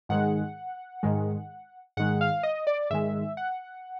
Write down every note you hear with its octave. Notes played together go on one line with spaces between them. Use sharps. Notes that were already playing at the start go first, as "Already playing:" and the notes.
G#2 D#3 G#3 F#5
G#2 D#3 G#3
G#2 D#3 G#3 F#5
F5
D#5
D5
G#2 D#3 G#3 E5
F#5